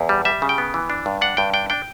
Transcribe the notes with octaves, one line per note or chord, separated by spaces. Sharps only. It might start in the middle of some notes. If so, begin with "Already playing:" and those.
Already playing: E2
G3
G3 E5
C#3
G5
B3
E3
D4
G2
D4 F#5
G2 G5
D4 G5
D4 G5